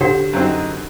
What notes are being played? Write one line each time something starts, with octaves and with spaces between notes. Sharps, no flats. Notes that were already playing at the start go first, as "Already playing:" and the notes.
D3 G4 C5 F#5
F#2 F#3 C4 D#4